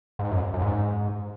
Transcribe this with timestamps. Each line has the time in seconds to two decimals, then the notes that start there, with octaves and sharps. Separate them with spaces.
0.19 G#2
0.31 F#2
0.54 F#2
0.62 G#2